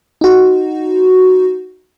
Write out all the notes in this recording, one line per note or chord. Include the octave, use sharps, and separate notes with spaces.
D#4 F#4